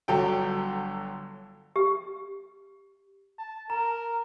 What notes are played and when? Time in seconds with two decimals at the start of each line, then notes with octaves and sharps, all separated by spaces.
0.08 G1 D3 F#3 A4 G5
1.76 G4
3.39 A5
3.70 A#4 A#5